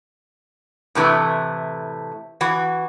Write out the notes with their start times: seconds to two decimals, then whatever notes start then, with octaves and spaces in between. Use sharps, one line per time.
0.95 A2 C3 E3 A3
2.41 E3 F#4